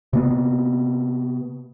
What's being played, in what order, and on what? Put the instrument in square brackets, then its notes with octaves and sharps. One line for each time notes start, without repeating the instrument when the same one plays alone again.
[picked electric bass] C3 A#3 B3